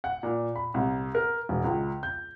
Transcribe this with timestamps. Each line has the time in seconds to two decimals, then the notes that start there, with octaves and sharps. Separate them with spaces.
0.04 F#5
0.23 A#2
0.56 B5
0.74 C2
1.15 A#4
1.49 E1
1.64 C#2
2.03 G6